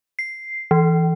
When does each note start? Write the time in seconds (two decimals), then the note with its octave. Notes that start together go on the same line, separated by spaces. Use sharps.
0.19 C7
0.71 E3